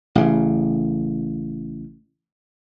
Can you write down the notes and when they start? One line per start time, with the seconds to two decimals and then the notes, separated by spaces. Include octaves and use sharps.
0.15 A1 C#3